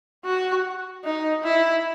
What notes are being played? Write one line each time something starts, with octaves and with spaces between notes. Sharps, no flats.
F#4
D#4
E4